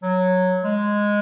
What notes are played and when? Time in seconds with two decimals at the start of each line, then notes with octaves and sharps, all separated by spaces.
0.03 F#3
0.63 G#3